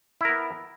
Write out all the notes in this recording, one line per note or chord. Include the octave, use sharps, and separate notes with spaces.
B3 E4 A#4